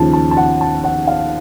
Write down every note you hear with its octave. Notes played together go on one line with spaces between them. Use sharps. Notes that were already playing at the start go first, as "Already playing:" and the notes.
Already playing: D#2 C#3 F3 A5
A5
A5
F#5
A5
F#5
F5